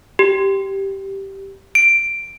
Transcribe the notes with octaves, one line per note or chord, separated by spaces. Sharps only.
G4
D7